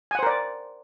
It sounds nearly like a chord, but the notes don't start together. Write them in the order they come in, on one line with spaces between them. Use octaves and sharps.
G#5 F#5 C5 A#4 D5